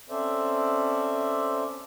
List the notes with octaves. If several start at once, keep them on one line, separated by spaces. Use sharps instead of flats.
C4 C#4 A4 C5 D5 E5